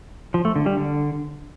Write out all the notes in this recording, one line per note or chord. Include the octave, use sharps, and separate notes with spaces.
F3
A3
D3
G3
D3